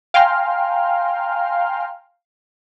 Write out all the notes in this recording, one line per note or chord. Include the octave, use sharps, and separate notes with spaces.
F5 G5 G#5 A#5 C6 F6